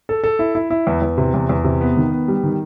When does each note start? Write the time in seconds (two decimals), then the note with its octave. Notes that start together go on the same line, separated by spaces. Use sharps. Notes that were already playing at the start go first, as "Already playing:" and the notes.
0.09 A4
0.24 A4
0.39 E4
0.55 E4
0.70 E4
0.87 E2
1.02 E2
1.18 C3
1.34 E2
1.49 E2
1.64 C3
1.81 B3
1.97 D#3
2.12 B3
2.28 G3
2.44 D#3